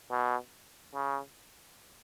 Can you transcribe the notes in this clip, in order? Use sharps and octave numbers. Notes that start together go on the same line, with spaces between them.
B2
C#3